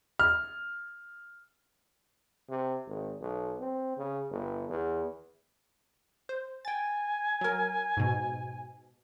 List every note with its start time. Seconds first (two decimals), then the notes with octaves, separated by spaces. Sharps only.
0.20 F6
2.50 C3
2.87 G#1
3.21 B1
3.60 C4
3.97 C#3
4.31 G1
4.69 E2
6.29 C5
6.65 G5 G#5 A6
7.41 F#3 A#4
7.97 G#2 B2